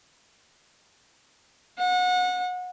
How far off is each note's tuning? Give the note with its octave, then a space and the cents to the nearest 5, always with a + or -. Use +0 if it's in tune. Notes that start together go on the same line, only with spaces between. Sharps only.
F#5 -30